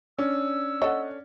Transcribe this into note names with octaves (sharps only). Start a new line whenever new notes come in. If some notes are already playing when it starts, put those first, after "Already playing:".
C#4 D4 E6
A4 C#5 D#5 F#5